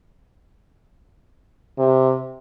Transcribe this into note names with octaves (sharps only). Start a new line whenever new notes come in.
C3